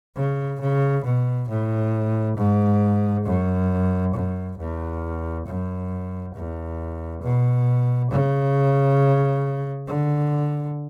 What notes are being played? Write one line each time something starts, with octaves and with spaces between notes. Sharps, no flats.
C#3
C#3
B2
A2
G#2
F#2
F#2
E2
F#2
E2
B2
C#3
D3